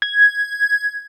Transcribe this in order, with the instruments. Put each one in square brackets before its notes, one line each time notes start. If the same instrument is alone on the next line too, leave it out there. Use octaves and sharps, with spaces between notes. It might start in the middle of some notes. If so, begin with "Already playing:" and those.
[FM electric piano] G#6